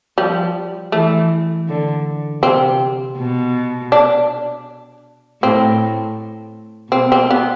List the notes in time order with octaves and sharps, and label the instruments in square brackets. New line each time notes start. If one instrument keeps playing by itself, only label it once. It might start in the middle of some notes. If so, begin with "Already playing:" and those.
[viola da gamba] F3 [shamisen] G3
[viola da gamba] E3 [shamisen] A3
[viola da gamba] D3
[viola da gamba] C3 [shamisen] C4
[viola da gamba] B2
[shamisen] D4
[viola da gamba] A2 [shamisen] C4
[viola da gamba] B2 [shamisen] C4
[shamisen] C4
B3